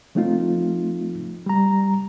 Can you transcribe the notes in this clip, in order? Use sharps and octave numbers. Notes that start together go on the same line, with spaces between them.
F3 A3 C4 D#4 F4
G3 A#5